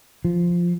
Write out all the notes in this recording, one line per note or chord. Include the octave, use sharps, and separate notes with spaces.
F3